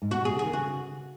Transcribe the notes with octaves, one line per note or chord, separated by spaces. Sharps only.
G#2
B2 F#4
B2
G#4
C#3
D#3 G#4
C#3 F#4